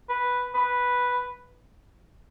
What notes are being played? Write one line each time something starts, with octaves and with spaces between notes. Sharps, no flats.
B4
B4